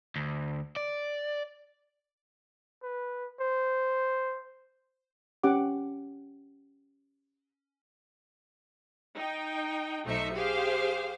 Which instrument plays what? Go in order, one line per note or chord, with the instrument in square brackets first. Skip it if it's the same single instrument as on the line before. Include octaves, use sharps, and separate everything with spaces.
[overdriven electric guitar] D2
D5
[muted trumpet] B4
C5
[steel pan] C#4 G4 F#5 D6
[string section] D#4 G5
B1 A3 D#4 C5 E5 C#7
G4 G#4 C5 F5